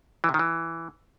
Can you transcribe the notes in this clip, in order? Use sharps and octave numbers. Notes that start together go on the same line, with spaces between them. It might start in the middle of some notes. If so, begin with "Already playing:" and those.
E3
C3
D#3
E3